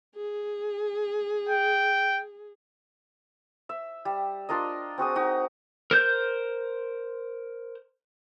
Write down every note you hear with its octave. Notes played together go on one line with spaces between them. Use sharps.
G#4
G5
E5
G3
D4 F4 A#4 D#5
C4 F#4 G#4 D#6
D#4 F#4
A#4 C5 G6